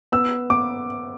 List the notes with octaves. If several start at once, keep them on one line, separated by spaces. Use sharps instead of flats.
B3 E6
B3 D6